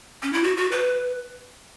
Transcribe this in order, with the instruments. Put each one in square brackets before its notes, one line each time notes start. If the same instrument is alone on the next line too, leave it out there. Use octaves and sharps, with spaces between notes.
[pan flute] C#4
E4
F#4
F#4
B4